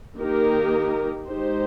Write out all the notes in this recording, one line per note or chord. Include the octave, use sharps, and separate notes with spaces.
D#3 A#3 D#4 G4 A#4
G#3 D#4 G4 C5